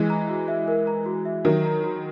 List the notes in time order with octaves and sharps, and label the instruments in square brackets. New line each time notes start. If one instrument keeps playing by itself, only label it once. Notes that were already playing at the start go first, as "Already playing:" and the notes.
Already playing: [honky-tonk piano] E3 G#3
[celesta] A#5
F#4
E5
A#4
A#5
F#4
E5
[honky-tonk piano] D#3 F#3 [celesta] A#4
[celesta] A#5
F#4